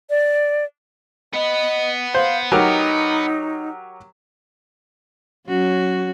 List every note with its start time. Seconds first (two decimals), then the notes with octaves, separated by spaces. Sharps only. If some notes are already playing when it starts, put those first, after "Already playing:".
0.10 D5
1.34 B3 B4 D#5
2.15 C5 F5
2.52 F#3 D#4 G4 A#4
5.47 F#3 C#4 F#4